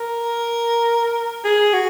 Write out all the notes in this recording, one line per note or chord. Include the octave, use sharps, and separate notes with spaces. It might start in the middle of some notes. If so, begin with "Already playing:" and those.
Already playing: A#4
G#4
F#4